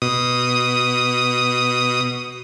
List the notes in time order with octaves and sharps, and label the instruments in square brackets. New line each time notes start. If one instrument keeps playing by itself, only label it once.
[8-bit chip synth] B2 D#6